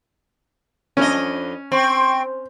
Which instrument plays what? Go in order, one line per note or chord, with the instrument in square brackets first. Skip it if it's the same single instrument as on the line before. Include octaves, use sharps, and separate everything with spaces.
[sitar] F2 D4 D#5 [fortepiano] C#4
[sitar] C4 [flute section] G5 C6 C#6